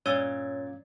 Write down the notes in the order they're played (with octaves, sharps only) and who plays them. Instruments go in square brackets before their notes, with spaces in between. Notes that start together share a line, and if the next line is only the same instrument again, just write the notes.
[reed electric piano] G2 C#4 G#6 [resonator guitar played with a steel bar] A#2 [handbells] C#5 E6